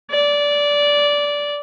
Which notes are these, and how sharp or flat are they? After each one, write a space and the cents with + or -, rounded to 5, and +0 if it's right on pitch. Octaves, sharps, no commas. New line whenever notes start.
D5 -15